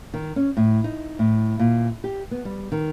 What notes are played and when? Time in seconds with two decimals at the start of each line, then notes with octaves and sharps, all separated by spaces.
0.14 D#3
0.36 C#4
0.57 A2
0.84 D#4
1.19 A2
1.59 A#2
2.04 G4
2.31 B3
2.45 G3
2.72 D#3